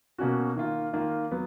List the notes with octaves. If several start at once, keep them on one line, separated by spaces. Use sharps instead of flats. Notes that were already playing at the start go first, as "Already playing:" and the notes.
B2 A#3 C#4 F#4
D#3 A#3 F4
D#3 A#3 F4
F#3 B3